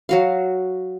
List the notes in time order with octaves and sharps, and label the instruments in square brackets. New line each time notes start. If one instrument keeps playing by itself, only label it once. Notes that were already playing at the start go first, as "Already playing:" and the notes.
[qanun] F#3 F#4 F5